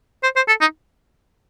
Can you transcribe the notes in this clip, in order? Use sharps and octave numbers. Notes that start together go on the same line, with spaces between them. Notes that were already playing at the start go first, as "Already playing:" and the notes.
C5
C5
A4
D#4